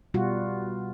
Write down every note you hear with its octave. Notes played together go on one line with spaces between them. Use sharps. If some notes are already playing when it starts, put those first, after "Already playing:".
B2 G3 F4 F#4